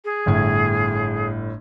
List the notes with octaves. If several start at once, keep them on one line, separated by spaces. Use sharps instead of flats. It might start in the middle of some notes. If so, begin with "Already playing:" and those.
G#4
G1 A2 G#6